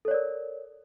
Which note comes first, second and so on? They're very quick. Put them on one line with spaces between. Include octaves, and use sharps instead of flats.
A4 C#5 D5 A#4